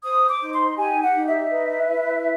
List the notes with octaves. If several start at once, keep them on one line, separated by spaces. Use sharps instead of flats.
C5 D#6
D6
D#4
C6
G4 G#5
F#5
D#4
E5
B4
E4